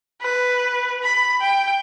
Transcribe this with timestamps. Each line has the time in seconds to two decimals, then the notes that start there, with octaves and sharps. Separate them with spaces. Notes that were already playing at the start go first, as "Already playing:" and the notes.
0.22 B4
1.02 B5
1.41 G5